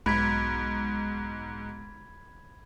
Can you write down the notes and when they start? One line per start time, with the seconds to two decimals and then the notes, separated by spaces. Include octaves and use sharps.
0.06 B1 G#2 B5 G#6 B6